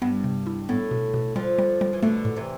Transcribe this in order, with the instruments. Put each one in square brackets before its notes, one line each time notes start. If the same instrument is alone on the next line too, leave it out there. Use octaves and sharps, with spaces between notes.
[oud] G2 [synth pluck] B3
[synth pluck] C3
E4
[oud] A2 [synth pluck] B3
[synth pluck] B2
B2
[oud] D3 F3 [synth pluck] G3
[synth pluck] G3
G3
[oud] E3
[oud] B2 D3 [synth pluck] A3
[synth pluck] A2
[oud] C3 E3